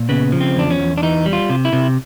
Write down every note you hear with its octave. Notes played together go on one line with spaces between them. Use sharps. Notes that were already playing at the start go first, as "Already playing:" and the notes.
Already playing: A#2
C#3 B3
F3
C4
E2 D4
C#4
E2
D4
E3 D#4
G3
F4
C3
E4
C3